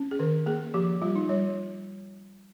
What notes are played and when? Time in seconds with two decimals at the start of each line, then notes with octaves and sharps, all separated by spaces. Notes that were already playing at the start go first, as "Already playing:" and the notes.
Already playing: C#4
0.11 G#4
0.19 D#3 A#4
0.46 A#3 G#4
0.74 F3 G4
1.02 G3 F4
1.16 D#4
1.29 G3 C#5